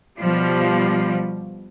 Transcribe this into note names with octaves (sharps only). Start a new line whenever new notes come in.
B2 F3 G3